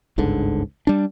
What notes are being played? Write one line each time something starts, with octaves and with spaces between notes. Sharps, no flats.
G1 C#2 G#2 D3
G3 D4